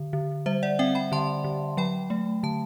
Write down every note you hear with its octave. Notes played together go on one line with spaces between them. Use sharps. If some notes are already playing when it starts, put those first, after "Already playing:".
Already playing: D3
D3
G3 C5 E5
D5 F#5
C4 E5 G5
G5 B5
D3 A5 C6
D3
F#3 G5 B5
A3
D3 A5